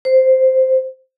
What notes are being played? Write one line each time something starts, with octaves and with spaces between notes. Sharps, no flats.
C5